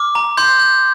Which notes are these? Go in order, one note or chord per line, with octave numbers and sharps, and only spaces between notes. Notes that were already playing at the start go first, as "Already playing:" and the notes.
Already playing: D6 F6
A#5
C6 G6
G6